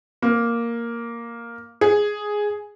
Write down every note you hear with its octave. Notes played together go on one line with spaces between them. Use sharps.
A#3
G#4